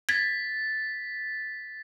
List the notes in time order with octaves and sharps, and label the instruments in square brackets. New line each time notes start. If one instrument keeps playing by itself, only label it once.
[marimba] G#6 [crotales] A6 B6